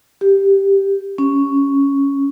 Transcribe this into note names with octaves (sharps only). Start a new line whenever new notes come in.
G4
C#4